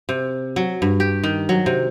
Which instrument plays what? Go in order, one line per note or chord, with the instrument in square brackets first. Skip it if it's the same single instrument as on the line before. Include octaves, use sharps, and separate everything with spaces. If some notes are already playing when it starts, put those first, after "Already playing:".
[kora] C3
F#3
G2
G4
D#3
F#3
C3